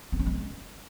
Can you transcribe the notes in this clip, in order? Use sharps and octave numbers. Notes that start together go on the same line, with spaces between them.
C4
C#4
G#3